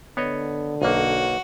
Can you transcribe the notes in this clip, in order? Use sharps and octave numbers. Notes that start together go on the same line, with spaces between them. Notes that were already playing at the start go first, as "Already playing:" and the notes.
D3 B3 C#5 D#5
B1 A#3 F#4